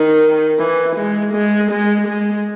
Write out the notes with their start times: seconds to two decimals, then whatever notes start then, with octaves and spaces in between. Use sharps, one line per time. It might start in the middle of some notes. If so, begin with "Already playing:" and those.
Already playing: D#3
0.59 E3
0.97 G#3
1.34 G#3
1.71 G#3
2.07 G#3